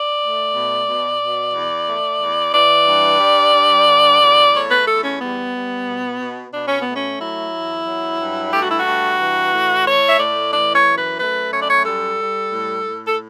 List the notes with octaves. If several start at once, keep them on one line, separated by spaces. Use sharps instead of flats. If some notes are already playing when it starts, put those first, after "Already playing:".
Already playing: D5
A3
B2
B2
B2
E2
A3
E2
E3 D5
G2
G3
G2
D3
E2
A3 C#5
B4
E2 A4
C#4
G3 B3
G3
B2
B2
B2 D4
C#4
B3
A3
C#4
F#3 E4
E2
F#3
G2
A3 G4
F#4
E4
F#4
G2
E3
A2
A3 C#5
E5
A2 D5
E3 D5
C#5
F#2
B4
A3 B4
F#2 C#5
D5
C#5
G3 A4
G3
A2
A2
A4